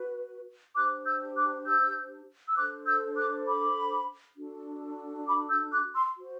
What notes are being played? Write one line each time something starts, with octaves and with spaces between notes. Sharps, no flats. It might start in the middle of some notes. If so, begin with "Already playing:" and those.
Already playing: F#4 B4
D4 G4 C5 D6 F#6
E6 G6
D6 F#6
E6 G6
E6
D4 A4 C5 D6 F#6
E6 G6
D6 F#6
B5 D6
D4 F#4 A4
B5 D6
E6 G6
D6 F#6
C6 E6
F#4 C5